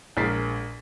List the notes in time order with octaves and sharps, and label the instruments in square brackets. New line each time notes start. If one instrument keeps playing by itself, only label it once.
[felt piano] A#1 G#3 A#4 A6 B6 C7